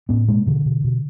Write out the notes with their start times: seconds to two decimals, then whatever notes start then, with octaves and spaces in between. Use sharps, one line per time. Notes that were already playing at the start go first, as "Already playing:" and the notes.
0.09 A2 B3 C#4
0.28 B2 G#3 A#3
0.46 B2 D3 E3
0.65 B2
0.84 B2